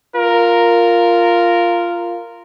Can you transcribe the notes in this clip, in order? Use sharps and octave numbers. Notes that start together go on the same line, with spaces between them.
F4 A#4